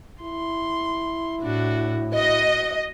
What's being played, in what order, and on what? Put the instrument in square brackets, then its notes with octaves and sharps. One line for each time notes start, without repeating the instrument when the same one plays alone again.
[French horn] E4 [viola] C6
[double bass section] A2 [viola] D4 F#4
[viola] F#4 [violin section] D#5